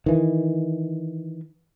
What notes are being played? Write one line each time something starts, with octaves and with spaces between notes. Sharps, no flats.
D#3 E3